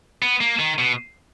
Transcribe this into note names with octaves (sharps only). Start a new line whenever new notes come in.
B3
A#3
D#3
B2